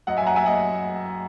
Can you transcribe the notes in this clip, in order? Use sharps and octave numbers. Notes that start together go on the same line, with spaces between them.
F#2 D#5 F#5
E5 G#5
F#2 F#5 A#5
F#2 E5 G#5
D#5 F#5